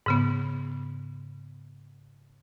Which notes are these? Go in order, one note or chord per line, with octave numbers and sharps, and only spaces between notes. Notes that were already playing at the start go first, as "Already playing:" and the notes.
G#2 C#3 B3